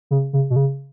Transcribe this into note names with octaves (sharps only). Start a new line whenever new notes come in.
C#3
C#3
B2
C#3